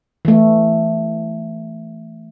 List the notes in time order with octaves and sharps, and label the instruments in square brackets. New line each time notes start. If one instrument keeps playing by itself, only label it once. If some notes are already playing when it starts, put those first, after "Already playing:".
[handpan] E3 A3